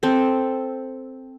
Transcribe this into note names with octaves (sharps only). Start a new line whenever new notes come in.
C4 A4